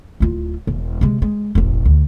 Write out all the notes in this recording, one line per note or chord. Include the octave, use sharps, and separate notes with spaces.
D1 F4
E1
C3 G#3
G#3
E1 A1
D2